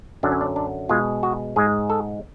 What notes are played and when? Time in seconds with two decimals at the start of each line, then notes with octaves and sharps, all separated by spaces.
0.23 F#2 D3 F#3 D4
0.32 C#4
0.41 D4
0.56 D4
0.89 B2 G#3 F4
1.23 F#4
1.56 G#2 G#3 G#4
1.90 A4